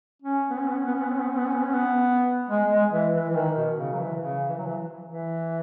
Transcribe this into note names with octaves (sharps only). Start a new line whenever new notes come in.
C#4
B3
C#4
B3
C#4
B3
C#4
B3
C#4
B3
C#4
B3
C#4
B3
C#4
B3
G#3
G#3
E3
E3
E3
D#3
B2
C#3
F#3
E3
C#3
E3
F#3
E3
E3